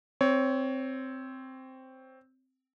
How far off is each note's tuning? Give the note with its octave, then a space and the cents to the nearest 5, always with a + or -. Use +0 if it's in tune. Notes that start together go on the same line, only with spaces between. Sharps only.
C4 +0 C#5 +15